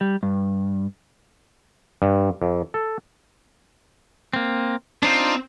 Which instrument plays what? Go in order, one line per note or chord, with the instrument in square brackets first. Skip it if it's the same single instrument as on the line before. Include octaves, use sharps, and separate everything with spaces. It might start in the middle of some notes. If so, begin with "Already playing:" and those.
[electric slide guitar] G3
G2
[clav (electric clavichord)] G2
F2
A4
[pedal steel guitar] A#3 C4
[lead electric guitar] C4 [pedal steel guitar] D4 D#4 F4